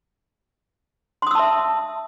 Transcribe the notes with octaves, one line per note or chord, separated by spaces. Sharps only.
E5 A5 C6 D#6 E6